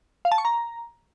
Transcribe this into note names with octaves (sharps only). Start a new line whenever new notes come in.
F5
A5
C#6
A#5